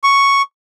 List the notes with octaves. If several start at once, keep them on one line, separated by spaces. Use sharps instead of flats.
C#6